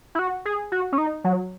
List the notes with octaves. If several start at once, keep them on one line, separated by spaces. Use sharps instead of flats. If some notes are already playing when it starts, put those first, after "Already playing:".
E4
F#4
G#4
F#4
C#4
D#4
F#3